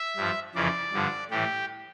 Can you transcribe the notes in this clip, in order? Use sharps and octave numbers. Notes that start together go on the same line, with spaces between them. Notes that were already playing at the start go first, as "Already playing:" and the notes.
Already playing: E5
G2 F3
F2 C#3 E3 D5
G2 D3 F3
A2 E3 G4